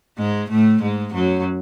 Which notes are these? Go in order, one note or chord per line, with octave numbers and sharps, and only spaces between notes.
G#2 G#3
A2 A3
G#2 G#3
F#2 F#3